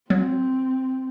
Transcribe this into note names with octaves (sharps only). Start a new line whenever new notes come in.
F#3 C4